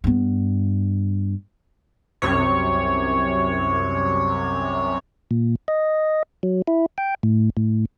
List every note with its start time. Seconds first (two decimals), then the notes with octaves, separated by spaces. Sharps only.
0.04 G2 B3
2.22 C2 F#2 C3 C#5
5.31 A#2
5.68 D#5
6.43 F#3
6.67 E4
6.98 G5
7.23 A2
7.57 A2